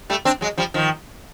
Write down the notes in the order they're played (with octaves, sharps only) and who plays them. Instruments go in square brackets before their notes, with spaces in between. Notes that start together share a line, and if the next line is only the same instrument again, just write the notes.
[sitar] G3 A3
C4 D4
F#3 G#3
F3 G3
D#3 F3